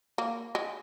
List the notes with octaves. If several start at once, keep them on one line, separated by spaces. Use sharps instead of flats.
A#3
G#3